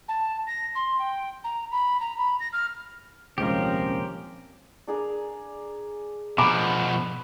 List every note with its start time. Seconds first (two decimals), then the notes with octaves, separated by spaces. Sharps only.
0.08 A5
0.47 A#6
0.75 C6
0.99 G5
1.44 A#5
1.71 B5
2.00 A#5
2.18 B5
2.40 A#6
2.53 F6
3.38 D#1 C2 F3 G#3 C4 C#4 G4 A#4
4.87 D4 G#4 A#4
6.38 B2 F3 B4 G#5 A#5 D6